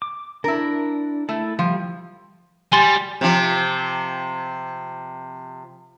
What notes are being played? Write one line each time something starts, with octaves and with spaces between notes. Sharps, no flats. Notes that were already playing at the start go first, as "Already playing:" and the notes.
D6
D4 E4 A#4
A3 E4 A4
F3 G3
G3 G#5 C6 A6
C3 F3